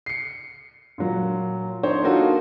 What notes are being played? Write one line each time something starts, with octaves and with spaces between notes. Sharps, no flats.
C7 C#7
A#2 F#3
D4 D#4 C5 C#5
A#3 D4 D#4 F4 F#4 A4